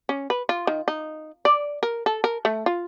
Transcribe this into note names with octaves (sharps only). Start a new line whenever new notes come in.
C#4
B4
F4
D#3
D#4
D5
A#4
A4
A#4
A3
F4